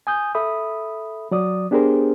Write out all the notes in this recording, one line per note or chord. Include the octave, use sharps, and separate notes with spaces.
G#5 D#6 G6
A4 E5 B5 D#6
F#3 D5 D#6
B3 D4 G4 G#4 A#4 C5